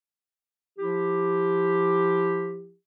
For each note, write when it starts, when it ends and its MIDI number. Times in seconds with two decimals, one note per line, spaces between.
0.79 2.75 53
0.79 2.75 64
0.79 2.75 67